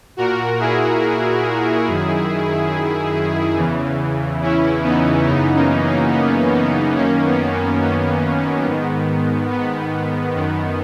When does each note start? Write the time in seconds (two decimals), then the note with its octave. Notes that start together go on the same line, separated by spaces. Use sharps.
0.17 A#2 F#4 A#4
0.60 E4 G#4
1.87 F#2 D#3
3.57 E2 C#3 E3
4.42 C#4 E4
4.84 B3 D#4
5.26 F#2 C#3 E3 B3 D#4
5.54 A#3 C#4
5.84 A#3
6.11 B3
6.54 B3
6.97 F#2 D#3 A#3 C#4
7.25 B3
7.53 A#3
7.82 B3
8.66 G#2 D#3
9.50 B3
10.35 F#2 D#3